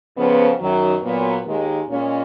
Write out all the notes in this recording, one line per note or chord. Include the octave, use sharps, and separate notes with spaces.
F2 C#3 F3 B3
F#2 D#3 F#3
A#2 F#3 B3
D#2 D#3 G#3
A#2 G#3 C#4